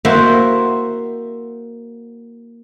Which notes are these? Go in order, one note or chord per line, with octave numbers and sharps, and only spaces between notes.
A#3 E4 F#4 C5 E5